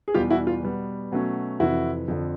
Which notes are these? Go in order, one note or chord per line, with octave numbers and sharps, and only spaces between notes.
G#4
E2 B2 G3 F4 G4
E4 F#4
F4
B2 G3 B3
B2 F#3 A3 C#4
F2 C3 E3 E4 F#4
F2 D3 F3